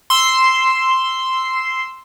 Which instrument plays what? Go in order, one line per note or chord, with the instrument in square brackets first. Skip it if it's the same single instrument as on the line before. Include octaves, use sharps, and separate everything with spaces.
[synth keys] C6 E6